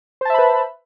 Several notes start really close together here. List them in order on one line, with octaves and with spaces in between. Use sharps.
C5 A5 E5 B5 B4